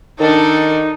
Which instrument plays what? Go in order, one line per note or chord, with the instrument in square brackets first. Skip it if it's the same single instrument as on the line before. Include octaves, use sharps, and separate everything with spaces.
[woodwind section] D#3 [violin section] D4 A4 [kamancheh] D#4